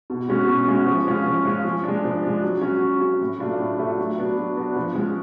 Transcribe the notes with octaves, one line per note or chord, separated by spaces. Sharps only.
B2
G#3 C#4 F#4
B2
G#3 C#4 F#4
F3
G#3 C#4 F4
F3
G#3 C#4 F4
F3
G#3 D4
F3
G#3 D4
F#3
C#4 F#4
F#3
C#4 F#4
A2
F#3 A3 D4 F4
A2
F#3 A3 D4 F4
F#3
B3 D4 F#4
F#3
B3 D4 F#4
F3
G#3 C#4